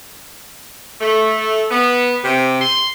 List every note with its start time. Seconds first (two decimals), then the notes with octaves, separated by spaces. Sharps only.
1.01 A3
1.70 B3
2.24 C3
2.60 C6